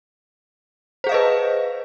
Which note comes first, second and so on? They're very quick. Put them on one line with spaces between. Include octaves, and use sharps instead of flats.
C5 G#4 F5 D#5 B4